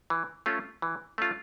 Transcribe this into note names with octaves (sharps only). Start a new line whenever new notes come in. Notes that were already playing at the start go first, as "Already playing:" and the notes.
E3
A3 C#4 F4
E3
A3 C#4 F4